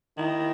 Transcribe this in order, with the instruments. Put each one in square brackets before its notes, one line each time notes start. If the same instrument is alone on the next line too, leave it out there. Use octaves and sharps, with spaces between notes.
[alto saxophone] D#3 [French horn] E4